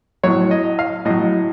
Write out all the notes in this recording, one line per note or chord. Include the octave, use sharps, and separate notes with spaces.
A2 F#3 C#5
D#5
F5
A2 F#3 D#5